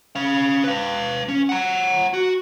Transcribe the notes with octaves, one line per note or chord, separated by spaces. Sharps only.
C#4 F5
B4 F5
C#4
F#5 A#5
F#4